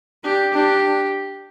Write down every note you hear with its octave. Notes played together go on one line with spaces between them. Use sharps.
D4 G4
D4 G4